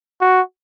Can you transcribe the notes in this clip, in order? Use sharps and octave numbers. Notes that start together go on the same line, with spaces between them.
F#4